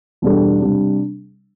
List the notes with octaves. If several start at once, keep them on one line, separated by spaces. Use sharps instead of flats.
E2 B2 G3 D4 A4
C3 G3 D4